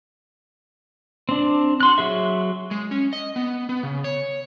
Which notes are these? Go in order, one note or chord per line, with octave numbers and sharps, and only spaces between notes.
C4 D4
F#4 C6 F#6
F#3 G#4 E5
G#3
C#4
D#5
B3
B3
C#3
C#5